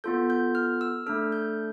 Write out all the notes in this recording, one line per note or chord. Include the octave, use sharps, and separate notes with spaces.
B3 F4 A4 G6
G6
F6
E6
A3 D4 A4 F6
G6